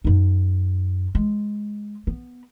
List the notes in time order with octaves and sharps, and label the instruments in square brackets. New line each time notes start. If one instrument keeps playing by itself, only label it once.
[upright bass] F#2 D#4
G#3
B3